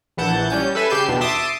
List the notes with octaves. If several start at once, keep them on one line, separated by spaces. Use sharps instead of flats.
A#1 E3 F#5 A5 G6
G3 C#4 G6
A4 B4 E5 G#5
C#3 G4 G6 C7 E7
E2 B2 D4
E5 A5 C6 D6 D#6